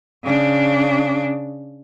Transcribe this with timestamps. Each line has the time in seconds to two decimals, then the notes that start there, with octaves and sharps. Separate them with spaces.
0.24 C#3 D4